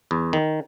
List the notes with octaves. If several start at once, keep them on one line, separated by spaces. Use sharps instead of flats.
E2
D#3